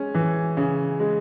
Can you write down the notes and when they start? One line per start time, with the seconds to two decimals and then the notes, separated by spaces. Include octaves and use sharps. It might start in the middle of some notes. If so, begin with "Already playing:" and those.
Already playing: G#3 C#4
0.14 E3
0.57 C#3
1.00 G#3